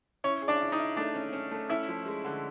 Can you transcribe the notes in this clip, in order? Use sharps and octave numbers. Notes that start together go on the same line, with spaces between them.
C#4 E4 C#5
G#4
D4 D5
E4
D#4 D#5
E4
A3 D4 D5
C#4
C#4
A3
C#4 E4 E5
F3
G#3
D3